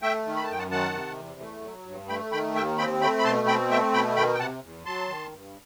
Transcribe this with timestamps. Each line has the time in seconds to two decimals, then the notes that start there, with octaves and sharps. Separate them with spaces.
0.02 A3 E5 G5
0.25 D#3
0.37 B5
0.44 A5
0.48 F#2 G5
0.58 F#5 A5
0.71 D#3 F#5 A5
0.94 C3
1.17 E2
1.40 A3
1.63 F#3
1.86 G2
2.09 A3 G5 B5
2.32 D#3 G5 B5
2.55 D#2 E5 G5
2.78 C4 G5 B5
3.01 A3 G5 B5
3.19 B5
3.24 B2 A5 C6
3.47 C4 G5 B5
3.70 A3 E5 G5
3.93 B2 G5 B5
4.16 D#3 G5 B5
4.34 G5
4.39 C3 F#5 A5
4.62 E2
4.85 F#3 A5 C6
5.09 D#3
5.32 G2